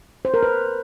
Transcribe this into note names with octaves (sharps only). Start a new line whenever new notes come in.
C5
A#4
B4